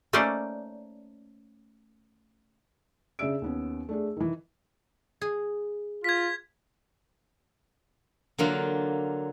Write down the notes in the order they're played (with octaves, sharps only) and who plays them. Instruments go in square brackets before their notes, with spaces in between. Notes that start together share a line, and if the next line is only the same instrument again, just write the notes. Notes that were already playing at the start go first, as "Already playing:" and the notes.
[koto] A3 A#3 C#4 D#4 C5 D5
[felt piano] C#3 D4 G#4 E5 E6 D7
D#2 B3 C#4
A3 D4 G#4
D#3 E3
[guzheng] G#4
[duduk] F4 [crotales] G#6 B6
[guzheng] D3 F#3 A#3 F4